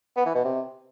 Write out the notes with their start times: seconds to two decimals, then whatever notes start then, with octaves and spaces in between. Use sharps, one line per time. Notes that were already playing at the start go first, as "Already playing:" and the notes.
0.16 B3
0.26 E3
0.35 B2
0.44 C3